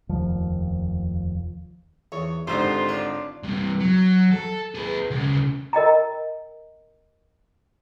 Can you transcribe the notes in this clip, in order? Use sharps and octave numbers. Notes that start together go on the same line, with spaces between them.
F1 D#2 F3
E2 C#5
G#1 D3 G3 D#4 F4 C5
D4 C#5
G2 C3
F#3
A4
G#4 B4
D2 C#3
A#4 D#5 G5 A#5